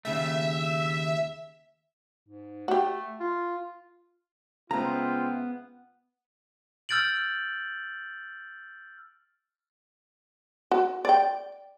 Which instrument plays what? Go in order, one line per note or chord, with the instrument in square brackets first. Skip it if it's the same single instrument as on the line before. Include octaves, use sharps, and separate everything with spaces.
[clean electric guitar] D#2 C#3 A3 [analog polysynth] E5
[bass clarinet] G#2
[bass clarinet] A3 [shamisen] F#4 G4
[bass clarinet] F4
[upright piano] C#3 G#3 C4 [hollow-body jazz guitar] B3 A#5 [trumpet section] F4 E5 G5
[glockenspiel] E6 F6 G6 A6 D7 F#7
[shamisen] F#4
D5 G5